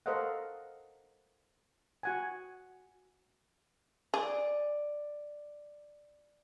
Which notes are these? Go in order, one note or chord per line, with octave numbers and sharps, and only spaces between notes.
A4 A#4 C5 D#5 F5 F#5
F#4 F#5 G#5
G#4 D5